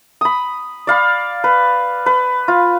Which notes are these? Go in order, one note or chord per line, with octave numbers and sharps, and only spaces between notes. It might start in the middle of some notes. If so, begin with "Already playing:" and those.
B5 D#6
D5 F5 B5
B4
B4
F4